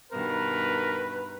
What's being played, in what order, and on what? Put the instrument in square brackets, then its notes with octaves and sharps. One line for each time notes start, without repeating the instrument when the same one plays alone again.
[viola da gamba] G2 B2 D#3 [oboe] A#4 [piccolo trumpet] B4